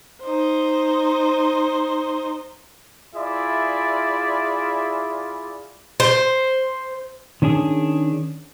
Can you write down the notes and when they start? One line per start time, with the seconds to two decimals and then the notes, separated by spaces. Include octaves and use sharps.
0.23 D#4 C5
3.15 E4 F4 G#4 D5 E5 B5
6.00 C5
7.42 D#3 C#4 D4 G#4